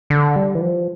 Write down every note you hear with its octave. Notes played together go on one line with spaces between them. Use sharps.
D3
G3
E3
F3